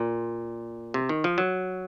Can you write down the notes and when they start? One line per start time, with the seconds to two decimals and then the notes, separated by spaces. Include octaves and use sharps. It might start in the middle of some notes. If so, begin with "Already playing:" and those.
Already playing: A#2
0.94 C3
1.09 D#3
1.24 F3
1.38 F#3